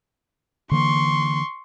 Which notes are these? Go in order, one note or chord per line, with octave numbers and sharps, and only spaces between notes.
D3 E3 A#3 C6 C#6